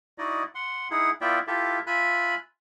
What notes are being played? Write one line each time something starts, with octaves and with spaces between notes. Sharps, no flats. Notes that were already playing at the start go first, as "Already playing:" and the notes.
D#4 E4 F#4 D5 D#5
F#5 C6
D#4 E4 G#4 F#5
B3 E4 F4 D5 E5 G5
E4 F4 G4 A4 E5
F4 E5 G#5 B5 F#6